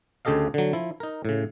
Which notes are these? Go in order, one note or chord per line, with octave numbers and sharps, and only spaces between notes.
D2 C#3 G4 A4 D#5 F5
D3 F#3
F3 E4
D#4 A#4
A2 C#3